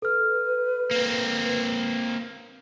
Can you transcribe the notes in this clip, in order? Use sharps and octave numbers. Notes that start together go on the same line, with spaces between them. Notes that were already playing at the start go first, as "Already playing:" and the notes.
A4 B4 F6
A#3 C4